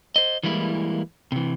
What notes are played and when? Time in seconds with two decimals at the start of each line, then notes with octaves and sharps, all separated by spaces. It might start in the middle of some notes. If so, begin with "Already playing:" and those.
0.16 C5 D#5
0.43 E3 G3 G#3 A#3 E4
1.32 C3 E3